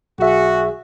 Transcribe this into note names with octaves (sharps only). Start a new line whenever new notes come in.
B1 F#4 G#4 E5